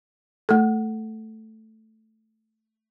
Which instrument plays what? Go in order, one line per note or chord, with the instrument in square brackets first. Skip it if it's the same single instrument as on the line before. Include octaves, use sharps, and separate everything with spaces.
[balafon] A3 A4